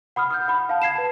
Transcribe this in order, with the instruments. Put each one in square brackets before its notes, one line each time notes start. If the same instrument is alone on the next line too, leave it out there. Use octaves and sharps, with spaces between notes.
[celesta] F#5 B5 D#6 F6
D#6 F6 G6
F#5 B5
F5 A5
G#6 C7 E7
B4 A5